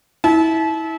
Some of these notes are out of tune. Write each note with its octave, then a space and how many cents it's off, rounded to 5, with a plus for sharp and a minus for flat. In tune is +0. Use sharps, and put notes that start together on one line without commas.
E4 -25 A5 -35